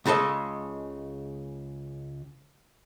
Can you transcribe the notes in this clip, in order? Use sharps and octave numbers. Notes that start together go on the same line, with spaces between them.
C#2 C#3 G#3 A4 D#5